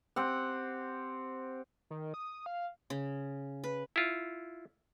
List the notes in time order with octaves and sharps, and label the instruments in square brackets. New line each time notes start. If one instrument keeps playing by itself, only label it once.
[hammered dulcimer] C4 G4 F#5
[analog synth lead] D#3
D#6
F5
[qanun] C#3
B4
[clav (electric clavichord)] E4 F4